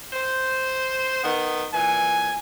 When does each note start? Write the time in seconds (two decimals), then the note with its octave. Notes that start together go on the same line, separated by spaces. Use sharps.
0.13 C5
1.24 D#3 B3
1.74 A#2 E3 G#5